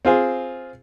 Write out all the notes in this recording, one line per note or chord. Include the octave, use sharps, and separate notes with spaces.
C4 F4 G#4